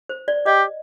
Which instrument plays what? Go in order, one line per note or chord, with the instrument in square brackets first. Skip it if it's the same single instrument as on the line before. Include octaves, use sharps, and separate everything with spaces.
[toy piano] C5
D5
[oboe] G4 [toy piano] D#5